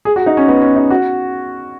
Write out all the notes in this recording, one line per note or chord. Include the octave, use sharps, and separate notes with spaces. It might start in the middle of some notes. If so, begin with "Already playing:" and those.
G#4
F#4
D#4
C#4
B3
C#4
D#4
F#4